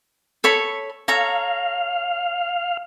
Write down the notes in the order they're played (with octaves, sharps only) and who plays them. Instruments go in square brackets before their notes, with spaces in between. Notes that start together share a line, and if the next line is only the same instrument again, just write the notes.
[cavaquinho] A4 C#5 B5
[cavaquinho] A4 C#5 A#5 [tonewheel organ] F5